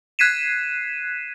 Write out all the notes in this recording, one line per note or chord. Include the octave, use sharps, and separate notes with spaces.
F#6 G#6 B6 C7 D#7 E7